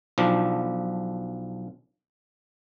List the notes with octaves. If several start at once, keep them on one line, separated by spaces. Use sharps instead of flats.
B1 F3 D4